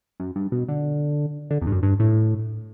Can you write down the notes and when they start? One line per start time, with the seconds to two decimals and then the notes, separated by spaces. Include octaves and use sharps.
0.20 F#2
0.36 G2
0.52 B2
0.68 D3
1.51 D3
1.61 E2
1.67 G2
1.72 F#2
1.83 G2
2.00 A2